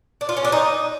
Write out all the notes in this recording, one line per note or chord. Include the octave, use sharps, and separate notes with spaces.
D4
F4
C#4
D4
D#4